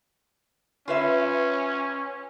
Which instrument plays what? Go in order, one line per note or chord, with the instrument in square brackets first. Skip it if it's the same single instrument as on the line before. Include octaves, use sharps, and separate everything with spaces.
[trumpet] C#4 [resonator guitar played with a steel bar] F4 B4 E5